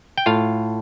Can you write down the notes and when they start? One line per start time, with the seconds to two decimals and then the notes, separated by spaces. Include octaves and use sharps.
0.18 G5
0.26 A2 F4 F5